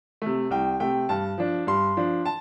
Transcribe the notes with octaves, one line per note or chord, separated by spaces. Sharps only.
C3 A3
C2 G5
C3 A3 G5
G2 A5
F3 D4
G2 C6
F3 D4
A5